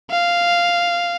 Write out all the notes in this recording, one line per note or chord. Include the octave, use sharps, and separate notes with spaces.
F5